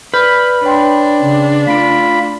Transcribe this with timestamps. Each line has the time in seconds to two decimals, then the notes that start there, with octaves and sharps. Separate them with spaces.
0.14 B4 D5 F6 G6
0.64 D4 C#5 G5 C6
1.22 C#3
1.67 A3 F4 B5 D7